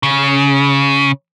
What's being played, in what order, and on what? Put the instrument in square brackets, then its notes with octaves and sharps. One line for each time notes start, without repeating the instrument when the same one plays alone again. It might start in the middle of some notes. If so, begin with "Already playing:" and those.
[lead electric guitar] C#3